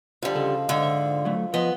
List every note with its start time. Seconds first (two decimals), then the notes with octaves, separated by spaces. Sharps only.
0.22 D3 F3 G3 F4
0.35 C#3 A4 D#5
0.69 G#2 D3
0.83 E5
1.25 F#3 A3
1.54 F3 B3 D#5